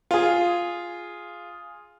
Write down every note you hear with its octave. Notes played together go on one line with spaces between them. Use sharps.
F4 G#4